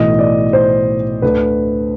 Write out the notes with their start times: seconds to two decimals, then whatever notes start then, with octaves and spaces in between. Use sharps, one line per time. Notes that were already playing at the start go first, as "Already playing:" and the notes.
Already playing: B1 A2 E3 D#5
0.19 D5
0.53 C5
1.22 D2 D3 B4